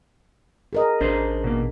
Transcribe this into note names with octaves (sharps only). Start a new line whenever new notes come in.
G#4 A#4 D#5
A1 D4 G#4 C5 D5
B2 A#3